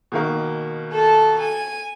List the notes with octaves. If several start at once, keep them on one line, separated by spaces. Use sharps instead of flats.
B2 D#3 A#3
A4 A5
G#5